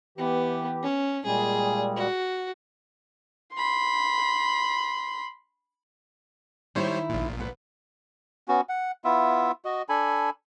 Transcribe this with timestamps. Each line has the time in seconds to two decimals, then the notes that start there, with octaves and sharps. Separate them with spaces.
0.18 E3 B3 G4
0.83 C#4
1.25 A#2 G3 G#3 G#4
1.97 F#4
3.55 B5 C6
6.75 D#3 G3 E4 C5 C#5
7.09 A#1 A#2
7.40 B4 F#5
8.48 B3 C#4 F#4
8.69 F#5
9.04 B3 E4 F4 E5
9.65 F#4 D#5
9.89 D4 A4 G#5 B5